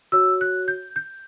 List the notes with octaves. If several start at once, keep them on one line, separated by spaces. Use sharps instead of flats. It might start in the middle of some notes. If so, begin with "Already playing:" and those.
F#4 C#5 E6
F#6
G6
G6